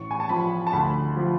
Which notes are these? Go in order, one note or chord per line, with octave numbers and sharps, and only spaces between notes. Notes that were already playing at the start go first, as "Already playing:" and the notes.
Already playing: A1 C#6
G#5
A5
F3 B5
A5
D2 B5
F3